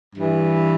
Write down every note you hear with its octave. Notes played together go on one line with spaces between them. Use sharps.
G2 E3